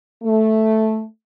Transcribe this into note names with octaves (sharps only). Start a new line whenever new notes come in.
A3